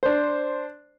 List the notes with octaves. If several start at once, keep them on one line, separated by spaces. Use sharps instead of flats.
D4 C5